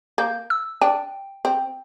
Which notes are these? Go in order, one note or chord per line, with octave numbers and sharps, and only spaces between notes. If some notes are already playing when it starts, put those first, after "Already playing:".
A#3 G6
E6
D4 G5
C4